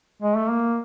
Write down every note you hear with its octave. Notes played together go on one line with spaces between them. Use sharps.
G#3
A3
A#3